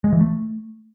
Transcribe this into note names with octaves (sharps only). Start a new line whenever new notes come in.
G#3
E3
A3